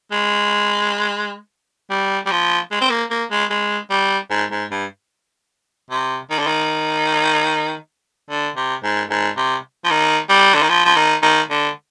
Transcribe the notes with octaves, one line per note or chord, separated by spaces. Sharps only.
G#3
G3
G3
F3
G#3
C4
A#3
A#3
G#3
G#3
G3
G#2
G#2
G2
C3
D#3
D3
D#3
D3
C3
G#2
G#2
C3
F3
D#3
G3
D3
D#3
F3
F3
D#3
D#3
D3